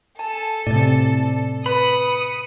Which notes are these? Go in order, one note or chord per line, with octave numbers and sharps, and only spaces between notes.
A4 G#5 A5
A2 C3 D5 A6
B4 B5 D#6 C#7